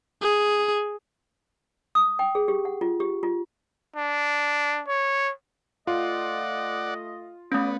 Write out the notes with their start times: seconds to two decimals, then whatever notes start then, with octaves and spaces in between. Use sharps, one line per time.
0.22 G#4
1.95 D#6
2.19 G5
2.35 G#4
2.48 G4
2.65 F#5
2.81 F4
3.00 G4
3.23 F4
3.96 D4
4.88 C#5
5.87 A3 F4 D5 D#5 F#5
7.52 B2 A3 B3 C#4 D5 D#6